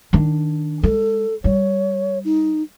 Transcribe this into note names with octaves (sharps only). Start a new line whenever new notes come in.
D#3 D4
G#3 A4
G3 C#5
D#4